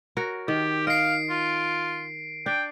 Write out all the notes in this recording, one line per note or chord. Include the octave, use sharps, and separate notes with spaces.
F#4 A#4 C#5
D#3 G4
D#5 F5 C7 D7
F4
D4 G5